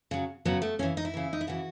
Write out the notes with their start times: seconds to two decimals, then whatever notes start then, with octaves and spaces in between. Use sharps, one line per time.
0.11 C#3 F#3
0.45 C#3 F#3 B3
0.62 A3
0.79 C#3 C#4
0.82 E3
0.97 D#4
1.05 E4
1.14 C#3 E3
1.33 D#4
1.41 E4
1.47 C#3 E3 F#4